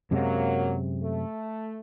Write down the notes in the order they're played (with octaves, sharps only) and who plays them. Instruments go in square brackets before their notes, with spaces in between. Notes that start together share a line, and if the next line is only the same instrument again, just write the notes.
[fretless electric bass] F#2 C3 G#3 [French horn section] F#3 A#3
[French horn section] A3